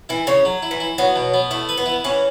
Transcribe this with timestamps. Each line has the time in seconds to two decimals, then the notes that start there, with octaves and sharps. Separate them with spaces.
0.09 E3 E4
0.27 C#3 C#5
0.45 F#3
0.63 E4
0.71 E3
0.80 E4
0.98 F#3 B3
1.16 B2
1.34 B3
1.51 A3 E4
1.69 B4
1.78 B3
1.86 E4
2.04 E3 C#4